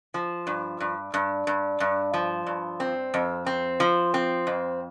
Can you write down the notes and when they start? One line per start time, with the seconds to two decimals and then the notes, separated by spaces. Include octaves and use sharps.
0.14 F3
0.47 G2
0.80 G2
1.14 G2
1.47 G2
1.80 G2
2.14 F3
2.46 G2
2.80 C4
3.14 F2
3.46 C4
3.80 F3
4.14 C4
4.47 F2